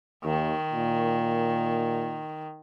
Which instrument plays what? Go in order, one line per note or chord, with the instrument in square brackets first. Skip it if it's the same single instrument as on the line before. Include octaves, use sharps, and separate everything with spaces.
[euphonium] D#2 [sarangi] D#3
[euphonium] A#2